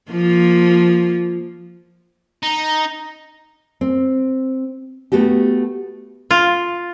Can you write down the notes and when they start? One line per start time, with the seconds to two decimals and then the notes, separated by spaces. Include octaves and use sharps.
0.11 F3 A#3 F4
2.43 D#4 A#5
3.81 C4
5.12 A3 B3 F#4 G4
6.31 F4